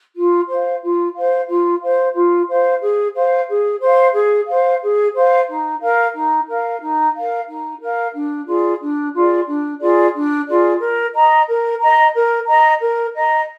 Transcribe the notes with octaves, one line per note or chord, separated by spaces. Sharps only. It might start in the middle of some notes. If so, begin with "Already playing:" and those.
F4
C5 F5
F4
C5 F5
F4
C5 F5
F4
C5 F5
G#4
C5 F5
G#4
C5 F5
G#4
C5 F5
G#4
C5 F5
D#4
A#4 F5
D#4
A#4 F5
D#4
A#4 F5
D#4
A#4 F5
D4
F4 G#4 D5
D4
F4 G#4 D5
D4
F4 G#4 D5
D4
F4 G#4 D5
A#4
D#5 A#5
A#4
D#5 A#5
A#4
D#5 A#5
A#4
D#5 A#5